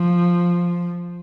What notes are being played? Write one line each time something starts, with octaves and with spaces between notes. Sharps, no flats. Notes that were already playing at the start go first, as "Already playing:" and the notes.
Already playing: F3